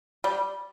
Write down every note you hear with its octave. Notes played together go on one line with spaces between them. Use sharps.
G3